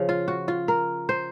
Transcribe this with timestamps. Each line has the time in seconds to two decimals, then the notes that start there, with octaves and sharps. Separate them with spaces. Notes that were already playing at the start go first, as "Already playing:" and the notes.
Already playing: C#3 F3
0.09 F4
0.28 F#4
0.48 F4
0.68 A#4
1.09 C5